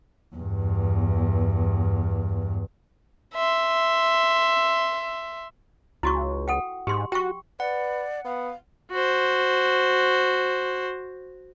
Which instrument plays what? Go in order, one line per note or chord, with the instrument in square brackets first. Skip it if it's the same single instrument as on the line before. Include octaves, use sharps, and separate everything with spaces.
[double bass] E2 G2
[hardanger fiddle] E5 C6
[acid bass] C#2 [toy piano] E4 F#4 C#6
[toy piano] A4 F#5 G5
[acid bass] G#2 [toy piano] G4 C6
[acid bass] F#4 [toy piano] G5 C#6
[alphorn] B4 [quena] D5 [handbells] F#5
[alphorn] B3 [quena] F5
[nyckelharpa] F#4 C5